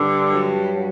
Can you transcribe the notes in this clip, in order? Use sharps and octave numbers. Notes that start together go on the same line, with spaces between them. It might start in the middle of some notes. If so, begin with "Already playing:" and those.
Already playing: G2 D3
F#3
F#3